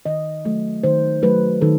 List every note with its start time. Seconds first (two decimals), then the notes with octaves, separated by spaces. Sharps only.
0.06 D#3 D#5
0.45 F#3 A3
0.83 D#3 C5
1.23 F#3 A3 B4
1.62 D#3 A4